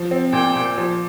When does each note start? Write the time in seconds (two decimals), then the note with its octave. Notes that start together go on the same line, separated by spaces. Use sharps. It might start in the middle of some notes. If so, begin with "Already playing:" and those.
Already playing: F3
0.11 C4
0.33 A#2 G5
0.55 A#2
0.78 F3